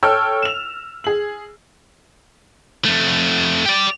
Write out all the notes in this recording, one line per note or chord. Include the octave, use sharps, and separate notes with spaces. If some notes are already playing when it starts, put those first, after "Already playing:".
A4 C#5 G5 E6 F6
E7 F7
G#4 F#7
F2 A3
G4 D5